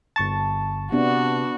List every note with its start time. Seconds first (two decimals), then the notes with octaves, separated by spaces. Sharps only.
0.16 G1 A5 C#6 A6
0.92 C3 B3 D4 F#4